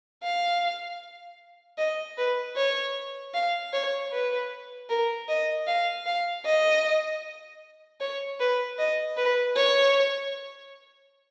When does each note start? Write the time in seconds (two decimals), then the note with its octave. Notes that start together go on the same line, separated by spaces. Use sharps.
0.23 F5
1.78 D#5
2.18 B4
2.56 C#5
3.34 F5
3.73 C#5
4.12 B4
4.89 A#4
5.28 D#5
5.67 F5
6.06 F5
6.45 D#5
8.00 C#5
8.40 B4
8.79 D#5
9.17 B4
9.56 C#5